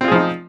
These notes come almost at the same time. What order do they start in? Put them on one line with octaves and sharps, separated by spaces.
C4 F4 G#4 F3 D#4